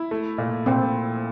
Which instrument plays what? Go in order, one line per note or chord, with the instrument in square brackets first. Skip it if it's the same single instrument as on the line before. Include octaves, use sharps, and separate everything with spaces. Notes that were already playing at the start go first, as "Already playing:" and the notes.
Already playing: [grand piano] E4
A3
A#2
[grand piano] A#2 [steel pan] C4